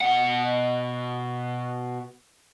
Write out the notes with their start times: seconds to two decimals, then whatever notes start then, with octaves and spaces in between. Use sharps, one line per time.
0.01 B2 F#5